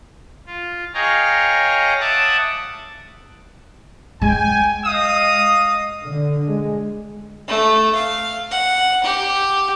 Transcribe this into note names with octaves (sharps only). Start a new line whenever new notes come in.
F4
G#4 C#5 D#5 F5 G5 A#5
E5 F#5 A5 D6 D#6 F#6
G#3 G5 G#5
D#5 F5 D#6
D3
G#3
A3
F5
F#5
G4